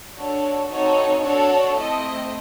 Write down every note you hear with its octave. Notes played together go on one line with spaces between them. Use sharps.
D4 F#4 A4 C#5
C4 D#4 F#4 A4 C#5
D4 F#4 A4 C#5
A3 C4 E4 D#5